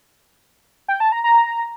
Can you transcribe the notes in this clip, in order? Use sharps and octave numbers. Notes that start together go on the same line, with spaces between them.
G5
A5
A#5
A#5